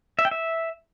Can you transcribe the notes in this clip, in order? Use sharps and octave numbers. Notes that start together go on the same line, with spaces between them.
E5
G5
E5